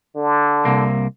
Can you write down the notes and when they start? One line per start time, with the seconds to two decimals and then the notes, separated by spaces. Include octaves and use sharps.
0.16 D3
0.65 C2 C3 A#3